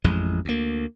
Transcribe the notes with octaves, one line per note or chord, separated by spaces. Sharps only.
A1 F2 G#3
D2 A#3